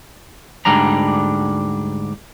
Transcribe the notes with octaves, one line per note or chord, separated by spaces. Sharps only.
D2 G#2 G3 D4 A#5